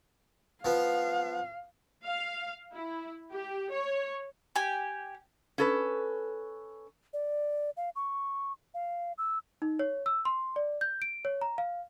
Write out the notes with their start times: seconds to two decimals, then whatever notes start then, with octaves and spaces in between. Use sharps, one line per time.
0.65 F3 B3 F5
2.05 F5
2.73 E4
3.32 G4
3.72 C#5
4.56 G4 G#5
5.58 C#4 A4 B4
7.13 D5
7.77 F5
7.96 C#6
8.74 F5
9.18 E6
9.62 D#4
9.79 C#5
10.06 E6
10.25 C6
10.56 D5
10.81 G6
11.02 D7
11.25 C#5
11.41 A#5
11.58 F5